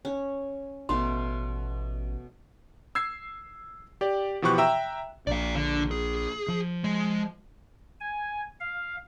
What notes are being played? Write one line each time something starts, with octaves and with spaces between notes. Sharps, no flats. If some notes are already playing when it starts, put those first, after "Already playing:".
C#4
A1 B2 A3 F5 C6
E6 G#6 C7
G4 D5
B2 E3 F3 G4 C#6 F#6
E5 G5 A#5 E6 E7
A#1 A#2 D5 F5
D3
G#4
F3
G#3
G#5
F5